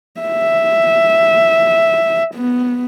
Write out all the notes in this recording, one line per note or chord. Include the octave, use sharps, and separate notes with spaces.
E5
B3